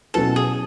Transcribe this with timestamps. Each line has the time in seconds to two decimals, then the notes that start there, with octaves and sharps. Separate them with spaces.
0.14 B2 F#3 C#4 E4 A4 B4
0.36 G#4